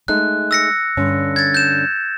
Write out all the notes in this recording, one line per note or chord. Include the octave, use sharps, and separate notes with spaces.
G#3 A3 D#4 F#6
E6 A#6 C#7
G2 D3 C#4
G#6 A6
G6 E7